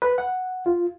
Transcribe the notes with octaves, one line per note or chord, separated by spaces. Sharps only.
B4
F#5
F4